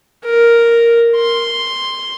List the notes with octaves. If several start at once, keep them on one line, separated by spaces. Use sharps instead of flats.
A#4
C6